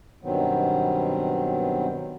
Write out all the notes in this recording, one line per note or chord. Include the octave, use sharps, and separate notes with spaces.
G2 B2 D#3 F#3 B3 C4